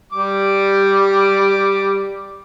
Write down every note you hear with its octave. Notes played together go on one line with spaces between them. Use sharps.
G3 D6